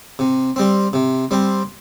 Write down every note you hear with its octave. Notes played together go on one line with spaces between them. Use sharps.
C3
G3 C4
C3
G3 C4